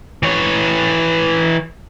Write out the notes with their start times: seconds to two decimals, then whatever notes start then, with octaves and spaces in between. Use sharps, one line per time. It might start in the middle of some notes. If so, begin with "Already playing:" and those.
0.23 E3 C#5